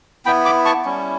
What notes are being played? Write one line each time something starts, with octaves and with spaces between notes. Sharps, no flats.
B3 E4 G5 B5
B5 D6
A5 C#6
G3 C#4 E4